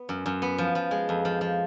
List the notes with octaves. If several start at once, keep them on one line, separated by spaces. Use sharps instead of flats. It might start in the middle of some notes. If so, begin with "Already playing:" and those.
Already playing: B3
F#2
F#2
B3
F3
F3
G#3
F2
F3
F3